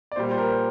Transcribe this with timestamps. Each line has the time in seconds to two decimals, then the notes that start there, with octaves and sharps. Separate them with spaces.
0.12 D5
0.16 A#2 G3 C5
0.31 C5
0.38 A#4